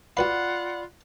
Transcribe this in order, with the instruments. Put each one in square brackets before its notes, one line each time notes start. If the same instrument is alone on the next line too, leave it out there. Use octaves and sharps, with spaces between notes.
[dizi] F4 [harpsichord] F#4 B4 F5 [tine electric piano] D5 B5 [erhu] F#5